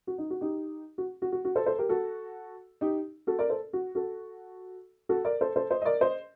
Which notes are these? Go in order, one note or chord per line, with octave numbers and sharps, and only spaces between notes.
F#4
D#4
F#4
D#4 G4
F#4
F#4
F#4
F#4
A4 C5
A4 C5
G4 A#4
F#4 A4
D#4 G4
F#4 A4
A#4 D5
A4 C5
F#4
F#4 A4
F#4 A4
A#4 D5
A4 C5
A4 C5
C5 D#5
D#5
A#4 D5
C5 D#5